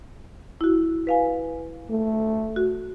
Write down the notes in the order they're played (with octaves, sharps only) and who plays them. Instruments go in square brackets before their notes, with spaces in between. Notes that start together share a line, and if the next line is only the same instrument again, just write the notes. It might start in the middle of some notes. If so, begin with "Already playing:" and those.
[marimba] E4 F#4
B4 F5 G#5
[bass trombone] A3
[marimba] F#4